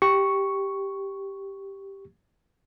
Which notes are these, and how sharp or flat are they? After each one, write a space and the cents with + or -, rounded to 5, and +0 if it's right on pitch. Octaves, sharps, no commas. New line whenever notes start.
G4 +0 C#6 +0